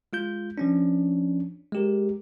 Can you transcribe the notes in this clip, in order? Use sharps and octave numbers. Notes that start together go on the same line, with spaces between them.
G#3 F4 G6
F3 C#4 D4
G#3 G4 A#4